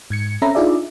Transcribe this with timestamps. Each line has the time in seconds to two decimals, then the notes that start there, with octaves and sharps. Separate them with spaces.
0.10 G#2 G#6 C#7
0.42 C4 C#4 A4 E5 A#5 B5
0.55 D4 D#4 F4 G#4 D5 E5